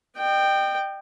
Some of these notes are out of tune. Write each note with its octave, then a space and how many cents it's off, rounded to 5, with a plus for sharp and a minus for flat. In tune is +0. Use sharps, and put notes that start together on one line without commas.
D#5 -40 G5 +0